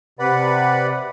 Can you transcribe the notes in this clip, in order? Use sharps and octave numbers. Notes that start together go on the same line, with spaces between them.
C3 B4 D5 F#5 B5